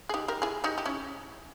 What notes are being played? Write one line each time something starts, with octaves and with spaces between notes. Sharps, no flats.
G#4
D#4 G4
G4 A#4
E4 G#4
D#4 G4
G4
C#4 E4